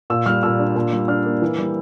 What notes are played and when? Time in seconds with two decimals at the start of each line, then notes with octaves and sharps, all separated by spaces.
0.10 A#2 E6
0.26 G3 F6
0.43 A#2 E6
0.59 D4
0.76 A#2
0.93 G3
1.08 D4 F6
1.25 A#3
1.42 E3
1.58 G3